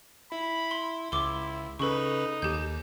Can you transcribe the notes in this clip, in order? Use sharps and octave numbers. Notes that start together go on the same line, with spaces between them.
E4 B5
C6
C#2 E4 C6 D6
C#3 D#4 A4 B4 C#6
D#2 G4 G6